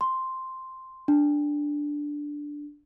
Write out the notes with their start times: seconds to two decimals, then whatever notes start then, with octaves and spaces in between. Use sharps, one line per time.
0.01 C6
1.08 D4